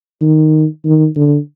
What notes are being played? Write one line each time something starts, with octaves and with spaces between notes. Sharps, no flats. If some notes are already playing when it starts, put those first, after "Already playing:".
D#3
D#3
D3